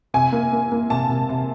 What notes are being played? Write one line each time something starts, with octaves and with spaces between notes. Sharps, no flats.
C3 G#5
A#3
A#3
A#3
C3 A5
C3
C3